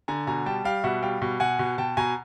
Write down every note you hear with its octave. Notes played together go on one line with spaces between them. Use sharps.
D3 G#5 A#5
B2 G#5 A#5
G3 G5 A5
G3 F5 G5
B2 E5 F#5
G3 F5 G5
B2
B2 F#5 G#5
B2
B2 G5 A5
B2 G#5 A#5